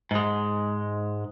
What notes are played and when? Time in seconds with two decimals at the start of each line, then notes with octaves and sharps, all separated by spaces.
0.11 G#2 G#3